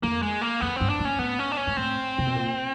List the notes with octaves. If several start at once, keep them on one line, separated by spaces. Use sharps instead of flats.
F2 A#3
G#3
A#3
F2 B3
G2 C4
D4
A2
C#4
A2 B3
C#4
D4
C#4
G#2
A2 C4
C3
B2
A#2